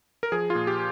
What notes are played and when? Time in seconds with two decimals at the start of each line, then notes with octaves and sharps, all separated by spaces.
0.23 A#4
0.32 F3 G#4
0.50 F4
0.55 A#2
0.67 G4